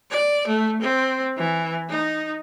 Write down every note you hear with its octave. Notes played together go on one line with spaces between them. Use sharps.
D5
A3
C4
E3
D#4